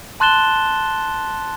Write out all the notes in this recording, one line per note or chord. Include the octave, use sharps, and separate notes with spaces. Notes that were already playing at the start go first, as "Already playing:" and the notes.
A5 C6 F#6 A6 E7 G7